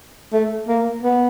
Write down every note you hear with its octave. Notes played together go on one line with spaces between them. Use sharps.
A3
A#3
B3